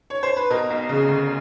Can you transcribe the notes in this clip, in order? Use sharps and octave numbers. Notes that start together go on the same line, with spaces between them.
C#5
C5
B4
B2 A#4
B1
C#3
D2